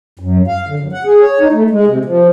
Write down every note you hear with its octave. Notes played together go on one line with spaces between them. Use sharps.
F#2
F5
D3
F#2
F#5
G#4
C#5
D#4
A3
G#3
C3
F3